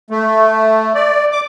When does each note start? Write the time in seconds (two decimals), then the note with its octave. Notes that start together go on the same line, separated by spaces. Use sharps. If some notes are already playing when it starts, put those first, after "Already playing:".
0.11 A3
0.95 D5
1.32 D6